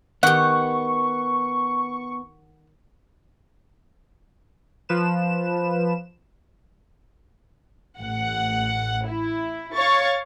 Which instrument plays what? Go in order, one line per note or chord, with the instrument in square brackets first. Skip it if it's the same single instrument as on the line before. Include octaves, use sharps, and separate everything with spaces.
[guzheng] D#3 G4 [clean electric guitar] B3 [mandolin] F#5 [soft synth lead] C#6
[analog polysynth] F3 B4 E7
[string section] A1 F#5
E4
C#5 F5 C#6 A6